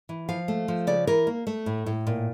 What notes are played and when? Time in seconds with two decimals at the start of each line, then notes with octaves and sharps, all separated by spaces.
0.09 E3
0.29 F3 F5
0.48 A3
0.68 F3
0.87 C#3 D5
1.07 E3 A#4
1.27 A#3
1.47 A3
1.66 A2
1.86 A2
2.07 A#2